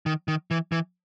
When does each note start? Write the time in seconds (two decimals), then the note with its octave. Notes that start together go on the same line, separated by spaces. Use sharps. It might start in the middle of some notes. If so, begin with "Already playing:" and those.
0.06 D#3
0.28 D#3
0.51 E3
0.72 E3